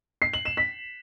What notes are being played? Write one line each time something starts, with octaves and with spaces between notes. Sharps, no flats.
C7
F#7
E7
B6